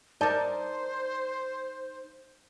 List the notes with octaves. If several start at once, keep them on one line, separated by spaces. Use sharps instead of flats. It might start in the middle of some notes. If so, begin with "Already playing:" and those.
D#4 A#4 C5 D5 A5